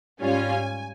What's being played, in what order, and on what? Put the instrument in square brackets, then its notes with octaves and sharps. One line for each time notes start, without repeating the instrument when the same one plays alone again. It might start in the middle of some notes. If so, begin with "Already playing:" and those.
[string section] G#2 G3 C#4 F4 G#5